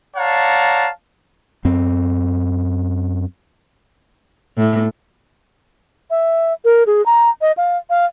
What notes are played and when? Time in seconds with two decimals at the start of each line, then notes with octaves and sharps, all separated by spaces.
0.17 C#5 D5 F5 F#5 A5 A#5
1.65 F#2 C4
4.57 A2
6.10 E5
6.65 A#4
6.87 G#4
7.06 A#5
7.41 D#5
7.57 F5
7.90 F5